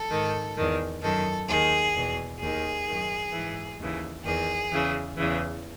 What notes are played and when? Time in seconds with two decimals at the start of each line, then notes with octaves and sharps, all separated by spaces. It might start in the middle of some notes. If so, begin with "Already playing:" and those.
Already playing: A4
0.10 G#2 D#3
0.57 E2 D#3
1.02 F#2 D#3 A4
1.48 D#2 D#3 G#4
1.94 E2 B2
2.40 D#2 D#3 G#4
2.87 F#2 D#3
3.33 G#2 E3
3.79 D#2 C#3 E3
4.25 E2 D#3 G#4
4.71 E2 C#3 E3
5.17 E2 C#3 E3